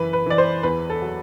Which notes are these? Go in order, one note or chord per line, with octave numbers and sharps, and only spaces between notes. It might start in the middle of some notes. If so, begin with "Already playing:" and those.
Already playing: F#1 E3 B4
B4
E3 D5
C5
E2 B4
A4
F#3